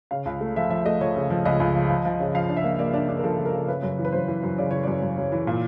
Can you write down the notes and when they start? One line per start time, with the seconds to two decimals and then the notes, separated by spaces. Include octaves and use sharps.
0.11 C#3 F5
0.26 C#2
0.41 A3
0.56 F3 E5
0.70 F3 E5
0.86 A3 D#5
1.01 F3 C#5
1.16 C#3
1.30 F3
1.45 C#2 D#5
1.60 C#2
1.75 F3
1.89 F3
2.05 F3
2.20 C#3
2.35 F3 F5
2.49 D4
2.57 E5
2.64 A#3
2.79 A#3 D5
2.94 D4
3.09 D4
3.19 A#4
3.23 F3 A4
3.39 F3
3.46 A#4
3.53 C#3
3.68 C#3 B4
3.83 F#2
3.99 E3
4.05 B4
4.12 F#2 C5
4.28 E3
4.43 F#2
4.58 C#3 D5
4.71 E3 C#5
4.83 F#2 D5
5.02 F#2
5.17 F#2
5.32 E3
5.47 A#2